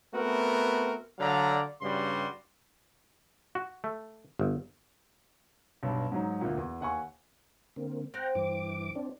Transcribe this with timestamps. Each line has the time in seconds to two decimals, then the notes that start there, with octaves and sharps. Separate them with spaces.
0.14 A3 B3 C4 F#4 A#4
1.19 D3 F#3 D5 F5 A#5
1.82 G2 C#3 G3 F#4 C6
3.55 F#4
3.84 A3
4.39 G1
5.83 B1 G2
6.12 G#2 F#3 D#4
6.41 D2 A#2
6.57 E2
6.81 D#2 F#5 G#5 C#6
7.76 D3 A#3 C4
8.14 C4 F#5 G5 A#5
8.35 G2 E3 D6
8.95 C4 D4